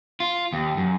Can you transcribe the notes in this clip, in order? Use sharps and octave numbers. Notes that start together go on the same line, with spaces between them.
F4
D#2
F#2